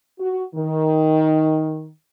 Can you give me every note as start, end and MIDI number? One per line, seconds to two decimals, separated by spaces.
0.19 0.43 66
0.55 1.88 51